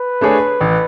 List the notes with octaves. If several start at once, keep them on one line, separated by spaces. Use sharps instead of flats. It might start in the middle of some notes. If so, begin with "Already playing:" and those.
Already playing: B4
A3 D4 G#4 C#5
A1